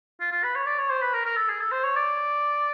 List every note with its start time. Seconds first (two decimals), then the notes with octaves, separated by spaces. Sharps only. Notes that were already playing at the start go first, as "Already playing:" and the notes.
0.20 F4
0.31 F4
0.44 B4
0.55 C#5
0.66 D5
0.78 C#5
0.90 C5
1.01 B4
1.13 A#4
1.25 A#4
1.37 A4
1.49 G#4
1.60 A4
1.72 C5
1.84 C#5
1.96 D5